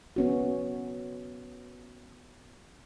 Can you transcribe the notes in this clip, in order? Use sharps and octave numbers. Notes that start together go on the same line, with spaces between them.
B3 C#4 F#4